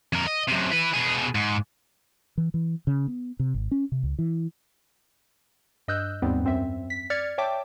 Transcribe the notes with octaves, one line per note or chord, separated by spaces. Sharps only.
F2 A#4
D#5
F#2 C3
E4 B4
B2 G#4
G#2
E3
E3
C#3
B3
C3
G#1
C#4
C3
C#2
E3
G2 D#5 E6 F#6 G6
D#2 G#2 G3 B3 C4
F#2 C4 E5
B6
D5 F6 G#6 A6 C#7
C#5 E5 G5 A5 D6